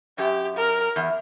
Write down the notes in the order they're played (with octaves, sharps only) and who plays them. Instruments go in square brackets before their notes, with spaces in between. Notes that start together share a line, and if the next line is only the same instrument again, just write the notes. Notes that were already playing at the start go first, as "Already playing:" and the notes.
[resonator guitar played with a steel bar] F#2 [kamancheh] G4
[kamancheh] A#4
[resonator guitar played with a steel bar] E2